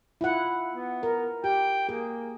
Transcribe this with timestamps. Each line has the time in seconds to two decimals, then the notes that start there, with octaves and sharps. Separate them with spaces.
0.21 E4 F4 F#5
0.72 B3
1.03 A#4
1.44 G4 G5
1.89 A#3 G#4